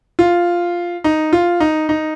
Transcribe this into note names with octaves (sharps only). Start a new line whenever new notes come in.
F4
D#4
F4
D#4
D#4